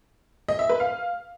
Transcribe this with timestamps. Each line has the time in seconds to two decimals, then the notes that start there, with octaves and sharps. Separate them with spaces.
0.48 D#5
0.59 E5
0.69 B4
0.80 F5